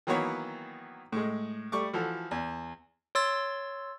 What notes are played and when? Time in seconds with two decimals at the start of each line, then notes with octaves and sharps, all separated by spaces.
0.07 D#3 E3 F#3 A#3 B3 C#5
1.12 A2 G#3
1.72 G3 A3 C#6 D6
1.93 E3 F3 F#4 A4
2.31 E2
3.15 C#5 C6 E6 A6